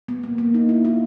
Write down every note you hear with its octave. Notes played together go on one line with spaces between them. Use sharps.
B3
A#3
A#3
D#4
E4
F4